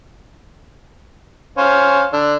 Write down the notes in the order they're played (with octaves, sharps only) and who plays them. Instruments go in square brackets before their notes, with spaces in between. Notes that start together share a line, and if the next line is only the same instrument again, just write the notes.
[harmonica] C#4 C5 F5
D3 D4